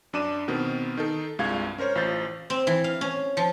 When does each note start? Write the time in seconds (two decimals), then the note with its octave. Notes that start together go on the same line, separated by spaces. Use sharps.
0.13 F#2 D4 A5 D6 D#7 E7
0.48 B2 D#3 B3 C4
0.97 D#3 D#4 A4
1.39 C2 G2 G#3 F4 F5 G#6
1.78 C#4 A#4 C5 C#5
1.95 A1 F4 C5 G6 A6
2.50 C4
2.67 E3
2.84 F5
3.01 C#4
3.37 F3